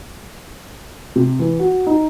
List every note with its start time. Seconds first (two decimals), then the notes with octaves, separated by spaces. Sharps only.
1.16 C3
1.39 E3
1.59 F#4
1.87 D#4